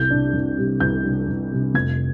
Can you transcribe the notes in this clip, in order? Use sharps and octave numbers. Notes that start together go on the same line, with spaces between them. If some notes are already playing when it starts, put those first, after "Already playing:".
Already playing: C2 G6
C3 G3 D4
C2
C3 G3 D4
C2 G6
C3 G3 D4
C2
C3 G3 D4
F1 G#6